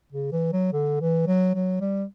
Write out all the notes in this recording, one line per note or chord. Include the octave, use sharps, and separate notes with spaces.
C#3
E3
F#3
D3
E3
F#3
F#3
G3